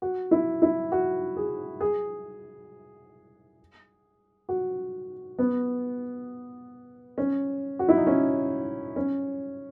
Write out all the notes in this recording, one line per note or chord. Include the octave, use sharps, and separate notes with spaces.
F#4
E4
E4
F#4
G#4
G#4
F#4
B3
C#4
F#4
E4
D#4
C#4
C#4